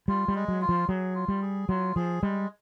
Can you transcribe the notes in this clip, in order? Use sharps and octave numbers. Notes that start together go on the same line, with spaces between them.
G3 F4
G3
G#3
F#3
F4
F3
F#3 G#4
F4
G3
G#4
F#3 F4
F3 G#4
G3 G#3